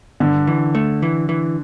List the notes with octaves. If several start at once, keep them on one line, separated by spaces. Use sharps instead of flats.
G2 D3
E3
A3
E3
E3